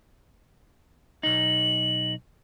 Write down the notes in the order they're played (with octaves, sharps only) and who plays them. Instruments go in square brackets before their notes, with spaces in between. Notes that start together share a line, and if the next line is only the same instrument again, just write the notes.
[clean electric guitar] B1 D#4 [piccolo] F#7